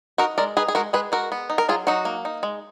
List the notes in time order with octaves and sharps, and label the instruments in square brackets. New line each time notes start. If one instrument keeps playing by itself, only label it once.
[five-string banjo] D#4 F#4 A#4
G#3 A#4 D5
D#4 G#4 B4
G#4
G#3 F#4 A#4
G#3 G#4 B4
G#3 F#4 A#4
B3
D#4
A#4
F#3 F4 G#4
F#3 D#4 F#4
A#3
D#4
G#3